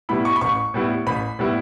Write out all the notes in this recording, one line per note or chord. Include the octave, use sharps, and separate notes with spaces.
A2 G3 B3 E4 B5
C#6
B5
A1 C#6
A2 G3 B3 E4
A1 B5
A2 G3 B3 E4